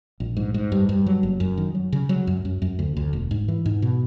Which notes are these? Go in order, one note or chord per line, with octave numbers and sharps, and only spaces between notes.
A#1
G#2
G#2
G2
G2
F#3
F#1
F#2
D#3
F#3
C#3
F#3
F#2
F#2
F#2
D2
D2
E1
G#2
E3
G#2
B2